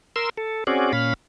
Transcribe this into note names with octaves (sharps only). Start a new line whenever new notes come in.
A#4 C6 E6
A4
C4 C#4 F#4 G#4 D5
A#2 C#4 F5 B5